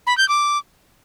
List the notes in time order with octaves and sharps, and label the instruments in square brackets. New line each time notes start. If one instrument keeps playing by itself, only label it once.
[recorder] B5
G6
D6